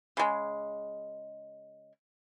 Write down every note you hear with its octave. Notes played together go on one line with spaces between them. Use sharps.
C#3 G#3